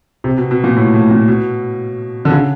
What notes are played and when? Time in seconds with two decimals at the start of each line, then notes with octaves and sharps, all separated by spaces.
0.24 C3
0.38 B2
0.51 B2
0.64 A#2
0.77 A2
0.94 A2
1.11 A#2
1.28 B2
2.25 D3
2.31 C#3